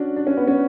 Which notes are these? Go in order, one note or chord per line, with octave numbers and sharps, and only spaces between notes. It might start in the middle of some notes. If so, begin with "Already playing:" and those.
Already playing: C#4 D4 F#4
D4
C#4
B3
C#4